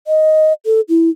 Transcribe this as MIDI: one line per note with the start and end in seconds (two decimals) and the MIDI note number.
0.07 0.53 75
0.66 0.81 69
0.89 1.10 64